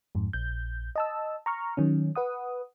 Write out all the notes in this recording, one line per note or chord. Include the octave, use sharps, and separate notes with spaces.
F2 G#2
A#1 G6
D#5 A5 E6
A#5 C#6 F6
D#3 F#3 C#4
B4 F#5 D#6